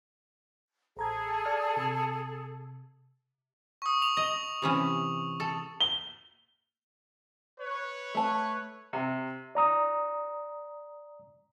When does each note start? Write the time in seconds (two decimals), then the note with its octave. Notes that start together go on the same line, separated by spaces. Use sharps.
0.97 A1 G#4 A4 A#5 G#6
1.45 D5 F6
1.77 C3
3.82 C#6 D#6
4.02 F7
4.17 D#5
4.62 C3 E3 C#4
5.40 A4
5.80 G7
7.58 B4 C#5
8.14 A3 A5
8.93 C3
9.55 D5 A#5 D#6